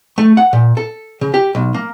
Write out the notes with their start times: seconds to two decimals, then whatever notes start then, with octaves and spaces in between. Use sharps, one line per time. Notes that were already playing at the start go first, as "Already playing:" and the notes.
0.18 A3
0.37 F#5
0.53 A#2
0.77 A4
1.21 C#3
1.34 G4
1.55 B1
1.74 A#3